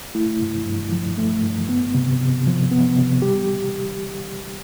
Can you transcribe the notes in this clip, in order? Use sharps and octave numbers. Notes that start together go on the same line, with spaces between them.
A3 E4
G2
G2
F3
A3
G2
B3
C3
C3
F3
B3
C3
G3 G4